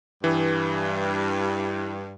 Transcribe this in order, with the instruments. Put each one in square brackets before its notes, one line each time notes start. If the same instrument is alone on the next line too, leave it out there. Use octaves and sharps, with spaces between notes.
[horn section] G2 [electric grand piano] E3